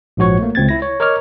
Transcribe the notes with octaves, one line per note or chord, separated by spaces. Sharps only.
A#1 G#2 F3 F#4 C#5 C#6
A3 A#3
C#2 C4 G#6 A6
E4 A#6
C#5
A#4 C#5 D#5 D6 F6